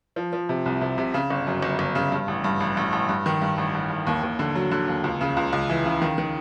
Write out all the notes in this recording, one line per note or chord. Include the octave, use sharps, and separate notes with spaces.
F3
F3
C3
C2
C3
C3
C#3
G1
F#2
G1
G1
C#3
G2
A1
G2
A1
A1
A1
G2
D#3
G2
A1
A1
A1
D#2
D#2
D3
F#3
D3
D#2
C#2
C#3
C#2
C#2
E3
C#3
D#3
D#3